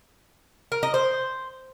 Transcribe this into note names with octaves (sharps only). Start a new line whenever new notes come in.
A#4
D#5
C5